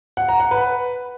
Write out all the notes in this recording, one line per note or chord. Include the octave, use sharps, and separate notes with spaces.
F#5
A#5
F#5
B4